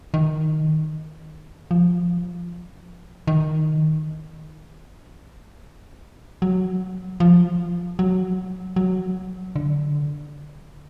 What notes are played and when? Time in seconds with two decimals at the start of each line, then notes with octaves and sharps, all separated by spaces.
0.14 D#3
1.71 F3
3.27 D#3
6.42 F#3
7.20 F3
7.99 F#3
8.76 F#3
9.56 D3